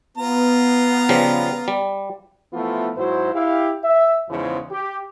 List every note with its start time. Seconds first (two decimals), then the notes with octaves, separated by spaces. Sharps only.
0.18 B3 F4 A#5
1.09 C#3 F3 G3
1.68 G3
2.53 E3 F3 A3 B3 E4 F4
2.96 G#2 F#3 E4 F#4 C5
3.33 E4 G4 F5
3.84 E5
4.29 E2 G#2 C#3 E3 F3
4.71 G4